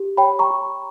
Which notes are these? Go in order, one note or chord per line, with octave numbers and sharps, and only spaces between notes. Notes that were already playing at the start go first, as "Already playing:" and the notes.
Already playing: G4
C#5 G5 B5
A#5 C#6
G4